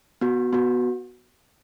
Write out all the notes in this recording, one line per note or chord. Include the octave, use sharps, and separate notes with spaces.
B3 F#4
B3 F#4